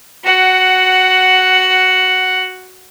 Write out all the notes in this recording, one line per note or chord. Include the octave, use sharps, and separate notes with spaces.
F#4 F#5